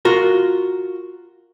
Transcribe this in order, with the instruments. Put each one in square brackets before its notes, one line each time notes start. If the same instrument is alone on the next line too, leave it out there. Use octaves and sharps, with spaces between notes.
[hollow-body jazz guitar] F4 F#4 A#4